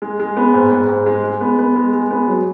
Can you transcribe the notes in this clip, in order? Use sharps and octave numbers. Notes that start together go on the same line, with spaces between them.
G#3
G#3
B3
G#2
G#2
G#2
G#3
G#3
B3
B3
G#3
G#3
B3
F#3